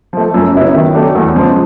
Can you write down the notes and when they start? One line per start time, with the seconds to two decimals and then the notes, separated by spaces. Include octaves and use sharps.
0.13 F3 A3
0.34 F#2
0.54 C#3 F#3 B3 E4
0.75 D#3
0.94 F#3 A3 D4
1.15 E2
1.35 C#3 F3 G#3